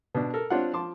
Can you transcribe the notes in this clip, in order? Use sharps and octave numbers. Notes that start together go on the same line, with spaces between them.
B2 D4
A4 A#4
C4 D4 F4 C#5 F#5
F3 A5 C6 D6